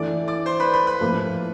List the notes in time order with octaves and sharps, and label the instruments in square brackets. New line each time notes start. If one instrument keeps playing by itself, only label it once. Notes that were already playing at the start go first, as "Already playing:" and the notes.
Already playing: [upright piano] E3 A3 D4 [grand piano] D5 D6
[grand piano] D5 D6
C5 C6
B4 B5
B4 B5
B4 B5
[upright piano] A2 F3 A#3